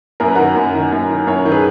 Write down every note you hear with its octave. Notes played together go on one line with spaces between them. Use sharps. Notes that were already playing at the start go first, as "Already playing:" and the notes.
F#2 A#4
B4
D#3 F#4 A#4
F#2
D#3
F#2
D#3
F#2 A#4 C#5
D#3
G#4 B4